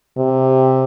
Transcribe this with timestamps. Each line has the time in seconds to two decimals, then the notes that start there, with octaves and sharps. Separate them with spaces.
0.18 C3